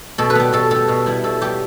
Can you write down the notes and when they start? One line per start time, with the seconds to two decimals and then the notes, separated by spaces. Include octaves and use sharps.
0.18 B2 A4
0.30 B4
0.35 G3 B3
0.53 B2 A4
0.71 G3 B3 A4
0.88 B2
1.06 G3 B3 E4
1.24 B2 A4
1.41 G3 B3 G4